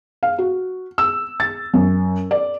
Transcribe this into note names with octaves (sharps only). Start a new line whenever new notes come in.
F5
F#4
E6
A6
F#2
D5